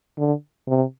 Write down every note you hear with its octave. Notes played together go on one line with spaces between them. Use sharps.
D3
C3